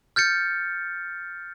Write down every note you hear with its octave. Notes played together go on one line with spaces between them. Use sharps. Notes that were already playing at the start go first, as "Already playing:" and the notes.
F6 G6 A6 C#7